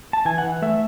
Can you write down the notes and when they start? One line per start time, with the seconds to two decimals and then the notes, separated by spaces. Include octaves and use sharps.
0.13 A5
0.25 E3 G#5
0.38 F#5
0.43 E3
0.62 A3 E5